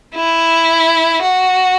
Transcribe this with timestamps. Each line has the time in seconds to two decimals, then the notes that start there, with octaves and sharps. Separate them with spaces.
0.15 E4
1.22 F#4